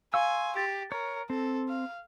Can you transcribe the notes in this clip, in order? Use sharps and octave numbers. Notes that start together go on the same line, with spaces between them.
F5 G#5 C6 C#6 E6
G4 A6
A#4 C#5
C4 A4
F5